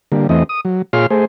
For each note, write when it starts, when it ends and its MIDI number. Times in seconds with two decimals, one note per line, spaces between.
0.12 0.27 50
0.12 0.27 55
0.12 0.27 58
0.29 0.43 40
0.29 0.43 52
0.29 0.43 57
0.29 0.43 60
0.29 0.43 75
0.49 0.61 87
0.65 0.82 54
0.93 1.06 46
0.93 1.06 65
0.93 1.06 68
0.93 1.06 73
0.93 1.06 84
0.93 1.06 89
1.10 1.25 57
1.10 1.25 68
1.10 1.25 72